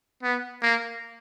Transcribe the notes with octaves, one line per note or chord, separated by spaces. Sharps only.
B3
A#3